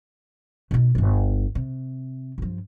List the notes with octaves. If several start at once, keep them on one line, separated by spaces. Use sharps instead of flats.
B2 D#4
D1 G1
C3
G2 F3